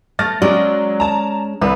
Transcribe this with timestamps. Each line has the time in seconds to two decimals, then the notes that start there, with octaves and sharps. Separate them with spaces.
0.19 A3 F6 A6 A#6
0.42 F#3 G#3 C#4 D5
1.00 A5 A#5
1.62 C2 B4